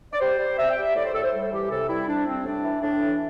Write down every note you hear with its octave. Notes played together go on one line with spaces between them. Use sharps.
D5
G3 C5
G3
C3 E5
G5
G3
E5
A2 D5
C5
A2 A4
C5
G3
E3 G4
C3 A4
G3 E4
C3 D4
G3 C4
A2 D4
E3
A2 D4
E3